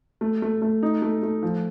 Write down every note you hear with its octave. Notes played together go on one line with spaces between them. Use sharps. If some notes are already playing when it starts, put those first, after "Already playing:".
A3
A3
A3
D#4
A3
A3
F3